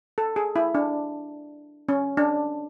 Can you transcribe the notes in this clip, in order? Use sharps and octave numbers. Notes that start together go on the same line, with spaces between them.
A4
G#4
E4
D4
C#4
D4